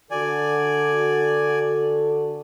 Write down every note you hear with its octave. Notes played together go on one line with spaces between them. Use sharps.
D3 F#4 A4 D5 G#5